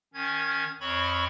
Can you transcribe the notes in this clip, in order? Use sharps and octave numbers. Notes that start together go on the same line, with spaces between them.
D#3 C#4 G#6
F2 C4 C#5 B5 C#6